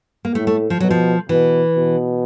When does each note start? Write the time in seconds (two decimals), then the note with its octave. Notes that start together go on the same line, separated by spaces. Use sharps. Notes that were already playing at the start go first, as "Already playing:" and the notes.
0.25 A#3
0.35 A2 A3
0.47 A3
0.70 F3
0.80 B2 F#3
0.91 F3
1.29 B2 E3
1.76 B2